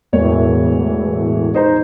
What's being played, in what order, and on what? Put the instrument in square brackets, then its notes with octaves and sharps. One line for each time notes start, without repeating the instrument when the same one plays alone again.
[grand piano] E1 A#4 C#5 [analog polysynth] E2 A2 E3
[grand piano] D#4 C5 A#5